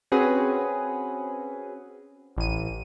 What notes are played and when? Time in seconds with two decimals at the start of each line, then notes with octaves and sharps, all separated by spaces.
0.12 C4 C#4 F#4 G#4 B4
2.37 A1 D#7